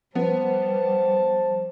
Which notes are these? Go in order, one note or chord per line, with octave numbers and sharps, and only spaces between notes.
F3 G3 B3 C5 A5